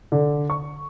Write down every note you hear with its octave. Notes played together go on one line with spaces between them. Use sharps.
D3
C#6